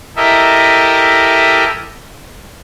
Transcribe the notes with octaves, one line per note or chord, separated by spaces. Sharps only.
E4 G4 A4 A#4 D#5 E5